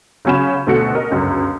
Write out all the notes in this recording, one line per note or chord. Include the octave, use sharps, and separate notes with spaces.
C#3 F#3 C#4 B5 E7
D2 B2 A3 F#4 C#7
A#4 D#5
G1 C#2 F#2